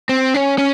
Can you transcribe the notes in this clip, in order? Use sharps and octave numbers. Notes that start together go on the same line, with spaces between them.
C4
C#4
C#4